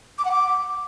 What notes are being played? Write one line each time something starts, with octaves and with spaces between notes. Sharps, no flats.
D6
F#5
D6